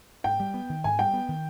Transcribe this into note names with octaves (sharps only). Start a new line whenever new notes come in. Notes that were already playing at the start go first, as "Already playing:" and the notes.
G#2 G5
G3
B3
D#3
G#2 G#5
G3 G5
B3
D#3